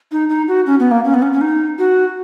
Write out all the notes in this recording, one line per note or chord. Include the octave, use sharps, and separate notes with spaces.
D#4
D#4
F#4
C#4
B3
A#3
C#4
B3
C#4
C#4
D#4
F#4